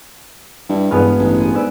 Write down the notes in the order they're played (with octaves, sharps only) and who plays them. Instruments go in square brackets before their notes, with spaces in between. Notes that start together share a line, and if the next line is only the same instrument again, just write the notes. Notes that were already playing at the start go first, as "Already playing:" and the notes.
[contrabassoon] G2 [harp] E4
[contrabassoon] E1 [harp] G2 B4 F6 [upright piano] G#3 B3
[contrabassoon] A1
[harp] G#4
[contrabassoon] G#2 [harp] B4 D5 E6